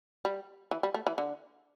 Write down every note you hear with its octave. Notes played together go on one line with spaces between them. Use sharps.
G3
E3
G3
A3
E3
D3